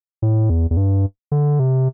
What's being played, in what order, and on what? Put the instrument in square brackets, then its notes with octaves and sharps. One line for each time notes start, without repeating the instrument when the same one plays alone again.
[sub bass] A2
E2
E2
G2
D3
C3